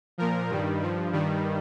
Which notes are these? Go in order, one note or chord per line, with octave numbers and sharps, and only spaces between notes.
A#2 F3 A#4
G2 D#3 G3
G2 F3
G2 D#3 G3